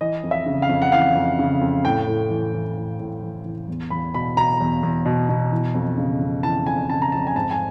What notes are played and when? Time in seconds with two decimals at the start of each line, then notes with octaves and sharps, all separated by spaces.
0.01 E3 D#5
0.23 F2
0.31 E5
0.46 C#3
0.62 F5
0.69 F2
0.82 F#5
0.92 E3 F5
1.15 F2
1.39 C#3
1.61 F2
1.85 A2 G5
2.07 A2
2.30 E3
2.53 E3
2.76 A2
3.00 A2
3.22 E3
3.45 E3
3.68 E2
3.90 E2 B5
4.14 B2 B5
4.37 B2 A#5
4.61 E2
4.83 E2
5.06 B2
5.29 B2
5.52 E3
5.74 F2
5.98 C#3
6.20 F2
6.43 E3 A5
6.66 F2 G#5
6.89 C#3 A5
7.02 A#5
7.12 F2 A5
7.27 G#5
7.35 G#2 A5
7.51 G#5